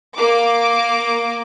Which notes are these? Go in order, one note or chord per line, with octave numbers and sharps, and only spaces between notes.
A#3 D6